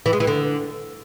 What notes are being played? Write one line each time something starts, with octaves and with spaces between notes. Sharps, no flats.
E3
G#3
E3
D3